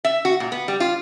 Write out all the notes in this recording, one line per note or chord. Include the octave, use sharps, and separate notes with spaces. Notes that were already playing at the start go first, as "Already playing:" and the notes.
E5
F#4
A#2
B3
G3
F4